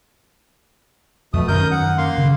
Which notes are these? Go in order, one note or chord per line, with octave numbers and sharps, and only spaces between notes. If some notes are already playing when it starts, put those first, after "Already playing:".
F2 B2 A3 D#6
F#2 D#3 C#4 A#4 D#6 G6
F#5
A#3 F5 C6
C#3